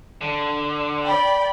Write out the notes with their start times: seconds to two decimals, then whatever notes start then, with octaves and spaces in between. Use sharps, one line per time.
0.21 D3
1.05 D5 G5 B5